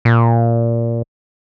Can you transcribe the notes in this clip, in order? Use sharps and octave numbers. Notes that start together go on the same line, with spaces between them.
A#2